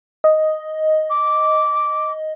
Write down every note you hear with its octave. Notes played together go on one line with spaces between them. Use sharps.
D#5
D6